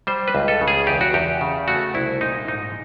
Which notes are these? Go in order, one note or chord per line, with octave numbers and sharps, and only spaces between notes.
G3 C5
B4
C#2
A4
C#3
G#4
E2 G4
F#4
E2 G4
C#3
A3 F#4
C2 E4
A#2 D#4
G#2 D#4